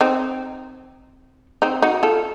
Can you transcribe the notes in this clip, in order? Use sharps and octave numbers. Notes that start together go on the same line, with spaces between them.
C4 D#4
C4 D#4
D#4 F#4
F4 A4